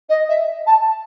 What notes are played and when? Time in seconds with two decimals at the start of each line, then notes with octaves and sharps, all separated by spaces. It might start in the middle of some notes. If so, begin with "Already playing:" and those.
0.09 D#5
0.29 E5
0.66 A5